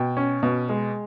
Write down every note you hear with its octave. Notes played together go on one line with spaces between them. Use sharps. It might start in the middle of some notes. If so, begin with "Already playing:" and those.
Already playing: B2 G5
C#4
B2
G#3